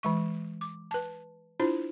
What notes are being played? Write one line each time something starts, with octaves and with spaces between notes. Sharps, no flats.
E3 G#3 C#6
D6
B4 A5
D4 E4 F4 C5